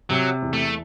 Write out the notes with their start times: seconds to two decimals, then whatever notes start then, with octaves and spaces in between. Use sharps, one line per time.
0.10 C3 F#3
0.42 E2
0.53 A3